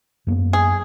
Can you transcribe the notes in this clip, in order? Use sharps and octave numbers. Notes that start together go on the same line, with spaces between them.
F#2 A#3 B3
G#4